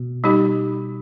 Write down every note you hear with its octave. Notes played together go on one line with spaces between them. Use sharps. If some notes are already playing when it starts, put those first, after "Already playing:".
Already playing: B2
G3 D#4 G4